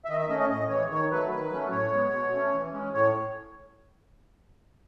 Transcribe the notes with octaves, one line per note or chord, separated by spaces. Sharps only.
E5
D#3 D#5
E5
A3 C#4 D#5
D#5
A2 D#5
E3 G#3 C#5
D#3 C#5
F#3 A3 B4
D#3 B4
F#3 A3 C#4
A2 C#5
G#3 B3
B2
A3 C#4
E3
G#3 C#4
A2 C#5